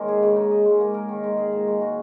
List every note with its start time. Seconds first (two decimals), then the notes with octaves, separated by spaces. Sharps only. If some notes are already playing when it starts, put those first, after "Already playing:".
Already playing: D#3 G#3 A#3 C#4 A#4
0.08 G#4
0.23 C#3
0.36 D#4
0.51 D#5
0.65 G#3
0.80 A#3
0.94 A#4
1.09 D#3
1.24 G#3
1.37 G#4
1.52 A#2
1.67 G#3
1.81 F#4